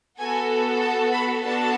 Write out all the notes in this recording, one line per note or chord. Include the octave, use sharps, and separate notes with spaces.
B3 F#4 A4 G#5
A5
B5
B3 D4 F#4 A4 A5